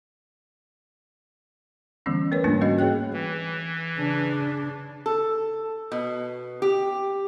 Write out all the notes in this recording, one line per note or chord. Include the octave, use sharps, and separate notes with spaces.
D3 E3 G3 B3 C#4
A3 A#4 B4 C#5
G#2 G3 A3 A#3 D4 F4
G3 C#4 F#4 D#5
G#4 C#5 G5 F#6
E3
C#3 D4
A4
B2
G4